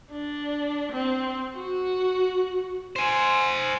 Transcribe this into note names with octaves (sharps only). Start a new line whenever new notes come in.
D4
C4
F#4
C5 G#5